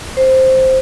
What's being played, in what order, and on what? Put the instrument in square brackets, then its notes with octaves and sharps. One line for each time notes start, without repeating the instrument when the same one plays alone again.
[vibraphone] C5